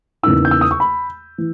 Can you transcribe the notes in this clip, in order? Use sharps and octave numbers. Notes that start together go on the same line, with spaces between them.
E2 C#3 E3 A#3 D#4 E6
G6
E6
D#6
C#6
B5
E3